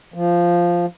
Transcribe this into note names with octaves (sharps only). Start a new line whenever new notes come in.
F3